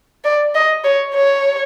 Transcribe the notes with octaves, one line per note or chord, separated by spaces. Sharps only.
D5
D#5
C#5
C#5